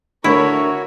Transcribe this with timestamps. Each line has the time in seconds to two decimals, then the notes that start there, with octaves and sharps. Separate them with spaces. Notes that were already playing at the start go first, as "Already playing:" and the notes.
0.24 D3 A3 E4 F#4 A#4 C#5